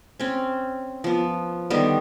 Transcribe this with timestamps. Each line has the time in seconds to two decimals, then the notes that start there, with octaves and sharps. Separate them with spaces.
0.20 C4 C#4
1.04 F3 B3
1.70 D3 D#3 G3 B3